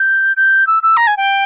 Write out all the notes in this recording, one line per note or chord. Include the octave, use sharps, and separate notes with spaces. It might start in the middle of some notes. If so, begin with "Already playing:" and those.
Already playing: G6
G6
E6
E6
A#5
G#5
G5